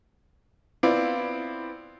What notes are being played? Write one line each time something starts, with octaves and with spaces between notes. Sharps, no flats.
B3 C4 E4 F4 D5